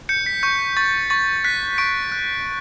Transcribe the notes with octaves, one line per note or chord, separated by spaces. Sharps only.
G6 C#7
B6
C#6 G6
C#6 A6
C#6 A6
F#6 B6
C#6 D7
F#6